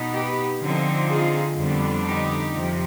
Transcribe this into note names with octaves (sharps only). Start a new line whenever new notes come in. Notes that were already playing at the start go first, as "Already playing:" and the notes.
Already playing: B2 B3 D#4
G4 B4
D3 F3 C4 D#4
F4 G#4
F2 D3 G3 B3 D4
D#4 G4
F2 C3 F3 C4